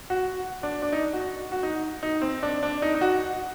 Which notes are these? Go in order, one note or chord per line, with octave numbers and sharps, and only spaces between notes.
F#4
D4
D4
D#4
F#4
F#4
D#4
D#4
C4
D4
D4
D#4
D#4
F#4